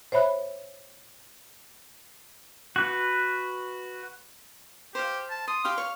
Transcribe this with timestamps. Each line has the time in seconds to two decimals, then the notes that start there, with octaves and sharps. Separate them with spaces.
0.12 C5 C#5 E5 B5 F#6
2.76 F#4 B4
4.95 G4 C5 F5
5.30 A5
5.48 C6 D#6
5.65 G4 F5 G5 C6
5.78 C#5